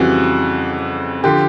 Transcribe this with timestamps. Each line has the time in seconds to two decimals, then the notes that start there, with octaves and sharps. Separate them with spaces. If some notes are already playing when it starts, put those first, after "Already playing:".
Already playing: F2 C#3 E3 G3 F#4
1.24 D3 F3 G4